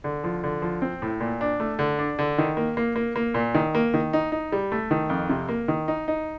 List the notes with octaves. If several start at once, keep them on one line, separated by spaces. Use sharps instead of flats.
D3
F3
D3
F3
C4
A2
A#2
D4
A3
D3
D4
D3
D#3
A#3
A#3
A#3
A#3
A#2
D#3
A#3
D#3
D#4
D#4
G3
A3
D#3
F2
C3
A#3
D#3
D#4
D#4